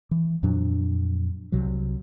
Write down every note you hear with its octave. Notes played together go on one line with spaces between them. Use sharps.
E3
F2 A#2 F#3 D4
C2 C3 F#3